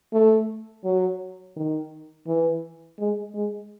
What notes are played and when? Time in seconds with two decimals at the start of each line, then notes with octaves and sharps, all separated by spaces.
0.13 A3
0.85 F#3
1.56 D#3
2.27 E3
2.99 G#3
3.34 G#3